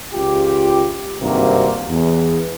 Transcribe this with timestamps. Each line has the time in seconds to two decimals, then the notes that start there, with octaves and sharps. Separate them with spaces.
0.14 C#2 F4 G4
1.21 G#1 G2 C3 A#3 F#4
1.89 E2